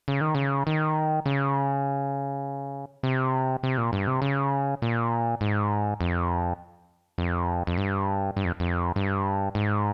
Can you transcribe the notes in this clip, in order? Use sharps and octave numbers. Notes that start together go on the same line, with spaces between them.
C#3
D#3
C#3
D#3
C#3
C3
C3
A#2
G2
C3
C#3
A#2
G#2
F2
F2
F2
G2
G2
F2
F2
G2
G#2